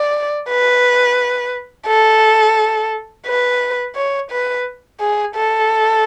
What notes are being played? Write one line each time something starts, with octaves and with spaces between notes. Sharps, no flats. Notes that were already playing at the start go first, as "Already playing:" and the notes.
Already playing: D5
B4
A4
B4
C#5
B4
G#4
A4